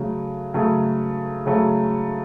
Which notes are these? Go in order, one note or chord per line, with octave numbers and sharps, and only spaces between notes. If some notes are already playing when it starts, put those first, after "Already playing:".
Already playing: C#3 F#3 A3
C#3 F#3 A3
C#3 F#3 A3